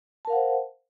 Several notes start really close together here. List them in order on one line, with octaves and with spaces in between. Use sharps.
A5 A#4 F5 F#5 C5